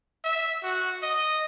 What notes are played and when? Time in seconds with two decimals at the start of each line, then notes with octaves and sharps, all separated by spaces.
0.24 E5
0.63 F#4
1.02 D#5